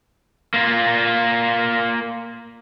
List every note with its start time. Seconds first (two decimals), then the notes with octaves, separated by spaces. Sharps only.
0.54 A#3 F4